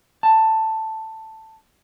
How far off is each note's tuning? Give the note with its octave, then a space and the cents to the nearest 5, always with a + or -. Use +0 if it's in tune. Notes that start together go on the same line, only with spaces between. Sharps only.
A5 +10